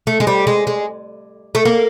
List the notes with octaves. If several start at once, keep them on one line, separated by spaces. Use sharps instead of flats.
A3
G#3
G3
G#3
G#3
A3
A#3